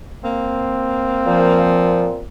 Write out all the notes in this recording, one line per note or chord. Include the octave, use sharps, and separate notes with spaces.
A#3 C4
A#2 F3